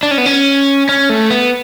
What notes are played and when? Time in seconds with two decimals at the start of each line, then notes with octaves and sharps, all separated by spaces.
0.03 D4
0.11 C#4
0.18 B3
0.26 C#4
0.89 C#4
1.10 A3
1.30 B3